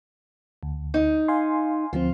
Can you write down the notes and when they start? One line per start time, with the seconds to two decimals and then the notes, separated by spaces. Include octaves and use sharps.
0.63 D2
0.94 D#4
1.28 F5 G#5 C6
1.93 D2 F3 C4 F4